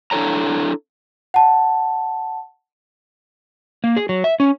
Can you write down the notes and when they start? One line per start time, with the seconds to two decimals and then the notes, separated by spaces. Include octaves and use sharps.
0.11 D4 E4 A4 C#5 A#5
1.34 F#5 A5
3.84 A#3
3.97 G#4
4.09 F#3
4.24 E5
4.40 C#4